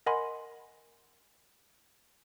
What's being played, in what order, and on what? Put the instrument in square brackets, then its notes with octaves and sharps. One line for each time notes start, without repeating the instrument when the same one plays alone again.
[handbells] A#4 D#5 F#5 G#5 B5 C6